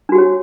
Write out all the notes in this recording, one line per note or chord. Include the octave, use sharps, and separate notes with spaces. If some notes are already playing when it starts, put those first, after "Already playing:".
D4 F#4 G4 C#5